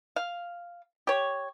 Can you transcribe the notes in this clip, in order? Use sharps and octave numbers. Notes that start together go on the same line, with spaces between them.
F5
G4 C#5